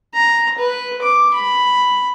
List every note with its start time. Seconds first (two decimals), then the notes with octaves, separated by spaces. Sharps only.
0.14 A#5
0.58 B4
1.02 D6
1.34 B5